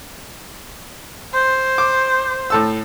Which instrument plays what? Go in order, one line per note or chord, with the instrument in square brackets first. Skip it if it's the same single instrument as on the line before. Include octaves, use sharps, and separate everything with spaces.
[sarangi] C5
[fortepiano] D6
A2 A4 E6